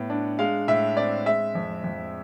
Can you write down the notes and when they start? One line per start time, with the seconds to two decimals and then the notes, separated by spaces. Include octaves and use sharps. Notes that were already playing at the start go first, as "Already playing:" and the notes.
Already playing: A2 B3
0.10 D4
0.39 G#3 F5
0.68 A2 E5
0.97 C4 D5
1.26 G#3 E5
1.55 F2
1.84 F2